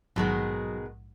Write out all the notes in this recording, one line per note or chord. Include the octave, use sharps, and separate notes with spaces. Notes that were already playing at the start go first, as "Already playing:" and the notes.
A#1 G#2 B2 D#3 F#3 G#3